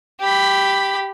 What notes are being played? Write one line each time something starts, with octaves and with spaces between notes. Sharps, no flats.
G4 B5